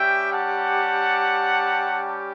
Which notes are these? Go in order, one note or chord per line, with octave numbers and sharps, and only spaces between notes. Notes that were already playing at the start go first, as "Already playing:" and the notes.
Already playing: G3 C#4 G4 E5 G5
F#5 A5